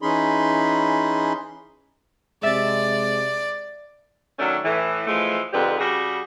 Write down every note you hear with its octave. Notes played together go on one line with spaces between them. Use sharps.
E3 C#4 D#4 G#4 B5 C6
C3 G#3 D5 E5 A6
D#3 F#3 A3 C#4 D4
A2 E3
E3 F3 G#3 A3
F2 G#2 D3 G4 B4
C#3 G3 F#4 G#4